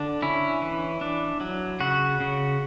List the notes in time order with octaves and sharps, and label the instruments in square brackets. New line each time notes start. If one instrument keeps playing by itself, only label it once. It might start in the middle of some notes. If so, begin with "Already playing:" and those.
Already playing: [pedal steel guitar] D3 D4
C#4 E4
E3
D4
F#3
C#3 F#4
C#3